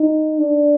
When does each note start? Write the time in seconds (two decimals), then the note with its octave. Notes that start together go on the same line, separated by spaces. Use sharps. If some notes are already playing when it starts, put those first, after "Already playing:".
Already playing: D#4
0.40 D4